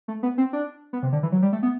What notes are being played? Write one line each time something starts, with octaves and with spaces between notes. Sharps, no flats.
A3
B3
C4
D4
B3
C3
D3
E3
F#3
G3
A3
B3